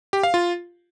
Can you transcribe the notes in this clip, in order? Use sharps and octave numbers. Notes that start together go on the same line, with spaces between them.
G4
F5
F4